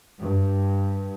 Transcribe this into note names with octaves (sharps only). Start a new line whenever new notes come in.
G2